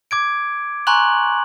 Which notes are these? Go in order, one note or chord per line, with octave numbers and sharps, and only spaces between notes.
D6 G#6 D7
G#5 A#5 C6 C#6 F#6 F#7